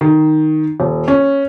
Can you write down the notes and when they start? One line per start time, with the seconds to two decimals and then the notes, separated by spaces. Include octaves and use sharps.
0.01 D#3
0.80 D#1
1.08 C#4